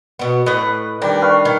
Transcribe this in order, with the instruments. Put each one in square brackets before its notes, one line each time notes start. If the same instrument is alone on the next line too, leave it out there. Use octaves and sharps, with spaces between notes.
[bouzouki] B2 B3
[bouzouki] A2 D#5 [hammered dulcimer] B4
[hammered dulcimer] D#3 G3 [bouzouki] D4
[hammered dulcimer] B4 F5 C#6
[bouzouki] D#3